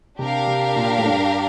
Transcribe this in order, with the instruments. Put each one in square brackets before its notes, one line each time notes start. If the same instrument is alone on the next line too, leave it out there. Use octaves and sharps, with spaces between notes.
[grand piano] C3 [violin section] D4 G4 A#4 F5
[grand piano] C3
A#2
A2
G2